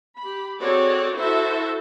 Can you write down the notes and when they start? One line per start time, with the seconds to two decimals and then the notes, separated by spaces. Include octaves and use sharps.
0.18 G4 B5
0.60 C4 F#4 G#4 A4 C#5 D5
1.14 E4 F#4 A4 C5 E5